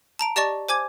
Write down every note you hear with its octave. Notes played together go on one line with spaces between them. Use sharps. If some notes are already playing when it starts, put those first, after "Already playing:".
A5 A#5 D7
G4 D5 D#5 A5 C#6 A6
C5 G#5 D6 G#6